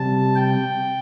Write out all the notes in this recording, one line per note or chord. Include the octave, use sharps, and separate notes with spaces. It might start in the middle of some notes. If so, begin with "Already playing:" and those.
Already playing: C3 G3 A5
G5